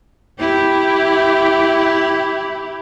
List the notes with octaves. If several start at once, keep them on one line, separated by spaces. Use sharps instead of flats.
E4 G4